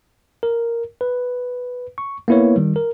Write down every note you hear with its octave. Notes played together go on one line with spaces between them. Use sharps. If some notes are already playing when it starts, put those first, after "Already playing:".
A#4
B4
C#6
A#3 B3 E4 B4 C#5
D#3 G3
A#4